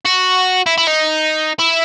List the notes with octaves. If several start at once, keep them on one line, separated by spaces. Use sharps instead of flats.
F#4
E4
E4
D#4
E4